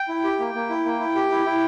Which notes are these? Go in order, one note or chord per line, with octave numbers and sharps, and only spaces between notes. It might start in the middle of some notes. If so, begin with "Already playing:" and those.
Already playing: G5
E4
G4
A#3
A#3
E4
A#3
E4
G4
E4
E4